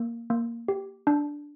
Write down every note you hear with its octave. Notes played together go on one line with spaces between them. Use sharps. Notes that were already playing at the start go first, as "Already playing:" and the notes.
Already playing: A#3
A#3
G4
D4